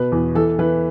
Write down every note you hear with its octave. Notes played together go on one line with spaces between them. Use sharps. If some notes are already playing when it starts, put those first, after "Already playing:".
Already playing: B2 B4
E2
E3 A4
E3 B4